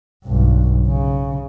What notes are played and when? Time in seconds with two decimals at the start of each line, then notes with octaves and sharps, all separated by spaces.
0.25 B1 G2
0.88 C#3